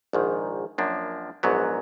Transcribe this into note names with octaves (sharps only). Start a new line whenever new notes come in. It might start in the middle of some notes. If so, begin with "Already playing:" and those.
A#1 G#2 D#3
F#2 F3 A#3 D4
A#1 G#2 F#3 B3